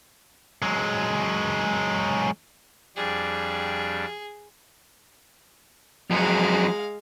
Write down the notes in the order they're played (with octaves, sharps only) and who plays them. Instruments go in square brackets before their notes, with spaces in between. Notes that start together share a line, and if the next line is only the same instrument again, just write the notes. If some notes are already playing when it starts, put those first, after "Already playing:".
[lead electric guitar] F#3 G#3
[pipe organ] F2 G3 D4 [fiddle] G#4
[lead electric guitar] F2 F#3 [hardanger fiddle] G#3 F5